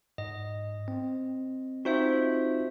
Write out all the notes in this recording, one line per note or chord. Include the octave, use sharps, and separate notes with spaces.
G#2 D#5
C4
C4 D#4 F4 F#4 C5 E5